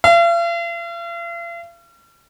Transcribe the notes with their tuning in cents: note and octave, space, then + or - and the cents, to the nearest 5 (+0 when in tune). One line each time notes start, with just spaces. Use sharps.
F5 -45